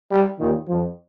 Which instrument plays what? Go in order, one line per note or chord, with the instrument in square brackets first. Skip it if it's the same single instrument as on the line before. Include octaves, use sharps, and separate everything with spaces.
[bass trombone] G3
[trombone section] D#2 D#3 [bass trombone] A#2
[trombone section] F2 F3